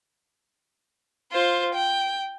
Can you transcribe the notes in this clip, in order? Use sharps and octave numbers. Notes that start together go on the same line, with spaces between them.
F4 C5
G5